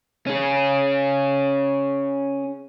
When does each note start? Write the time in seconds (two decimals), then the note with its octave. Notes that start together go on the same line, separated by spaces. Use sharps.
0.27 C#4 G#4